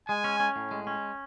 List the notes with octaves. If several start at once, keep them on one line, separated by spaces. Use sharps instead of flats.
G#3 G#5
C#4
C#4
A2
G#3
C#4